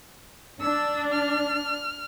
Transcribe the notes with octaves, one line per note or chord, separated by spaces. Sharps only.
D4 E6
F6